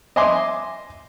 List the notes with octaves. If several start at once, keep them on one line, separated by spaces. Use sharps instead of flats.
D#5 E5 G#5 C6 D6